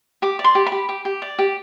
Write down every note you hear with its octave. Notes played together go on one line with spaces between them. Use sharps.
G4 D6
D5
C6
G4
B5
G4
G4
G4
D5
G4